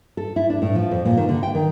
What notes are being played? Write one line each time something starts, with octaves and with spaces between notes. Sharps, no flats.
A4
E4
D4
A2
F3
F2
A#2
D#3
D3
G5
D#3